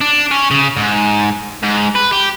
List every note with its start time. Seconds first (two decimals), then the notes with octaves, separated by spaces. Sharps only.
0.01 D4
0.31 C#4
0.51 C#3
0.76 G#2
1.63 G#2
1.95 B4
2.12 G4